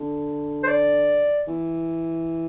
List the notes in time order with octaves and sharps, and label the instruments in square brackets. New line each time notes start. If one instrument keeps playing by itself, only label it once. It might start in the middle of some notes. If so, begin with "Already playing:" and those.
Already playing: [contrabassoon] D3
[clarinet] C5
D5
[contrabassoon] E3